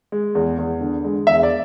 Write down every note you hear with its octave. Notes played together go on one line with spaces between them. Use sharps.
G#3
E2
E2
D3
G#3
E2 E5
D5